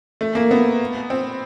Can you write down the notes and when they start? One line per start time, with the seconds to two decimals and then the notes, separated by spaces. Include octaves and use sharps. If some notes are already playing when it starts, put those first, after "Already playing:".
0.21 A3
0.35 A#3
0.51 B3
1.10 C4